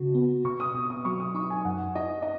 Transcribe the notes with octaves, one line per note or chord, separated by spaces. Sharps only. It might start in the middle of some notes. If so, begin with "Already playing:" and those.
Already playing: C#3 F#4
B3
B2 C#6
D#6
B2
D#6
F#3 C#6
D#6
D#4 C#6
G#5
F#2 F#5
D#4 D#5
D#5